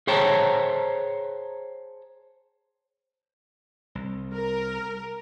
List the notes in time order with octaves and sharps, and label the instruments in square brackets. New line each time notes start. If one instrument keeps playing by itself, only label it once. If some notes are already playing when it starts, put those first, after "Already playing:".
[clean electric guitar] G#4 C5 C#5 G5 A5 A#5
[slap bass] C2
[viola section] A#4